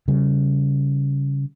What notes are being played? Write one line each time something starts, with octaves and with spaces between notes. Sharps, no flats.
C#3 G3